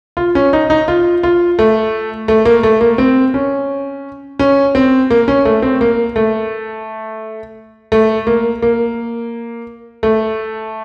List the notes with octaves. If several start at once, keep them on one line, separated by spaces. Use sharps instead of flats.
F4
C#4
D#4
D#4
F4
F4
A3
A3
A#3
A3
A#3
C4
C#4
C#4
C4
A#3
C#4
A3
C4
A#3
A3
A3
A#3
A#3
A3